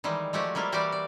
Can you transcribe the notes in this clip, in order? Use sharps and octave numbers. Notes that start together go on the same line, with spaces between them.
D#3 E3 G3 G#3
F3 G#3 A3 F#4 G4
G3 A#3 E4 F4
E3 G3 F#4 G4 C5 D5
D5